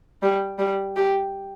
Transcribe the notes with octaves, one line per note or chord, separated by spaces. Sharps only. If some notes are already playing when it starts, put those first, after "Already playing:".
G3
G3
G4